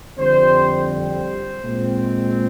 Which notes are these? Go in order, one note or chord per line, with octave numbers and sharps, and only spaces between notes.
F2 D3 G3 C4 C5
C5
A#2 G#3 C4